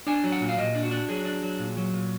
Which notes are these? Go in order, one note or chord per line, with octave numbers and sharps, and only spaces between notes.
D4 G#5
F#3
F#5
A#2
F5
A#2 D#5
D4
F#4
D4
F#3 G#4
D4
F#3
A#2
F#3
A#2